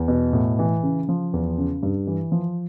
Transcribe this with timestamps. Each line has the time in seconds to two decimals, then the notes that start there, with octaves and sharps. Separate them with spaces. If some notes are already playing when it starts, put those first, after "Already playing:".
Already playing: E2
0.08 B2
0.33 A2
0.59 E3
0.83 C#3
1.09 F3
1.33 E2
1.58 C#3
1.83 G2
2.07 E3
2.32 F3